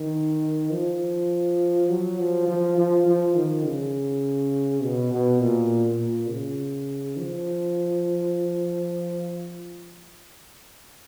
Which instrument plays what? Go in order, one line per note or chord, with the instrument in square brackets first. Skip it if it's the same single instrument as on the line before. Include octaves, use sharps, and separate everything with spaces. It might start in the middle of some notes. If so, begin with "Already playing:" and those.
Already playing: [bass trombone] D#3
F3
F#3
F3
F3
F3
F3
D#3
C#3
B2
B2
A#2
A#2
C#3
F3